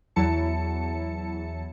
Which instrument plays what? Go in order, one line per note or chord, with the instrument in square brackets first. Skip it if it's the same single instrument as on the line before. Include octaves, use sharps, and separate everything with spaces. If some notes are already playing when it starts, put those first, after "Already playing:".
[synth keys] E2 F#3 E4 A5 C#7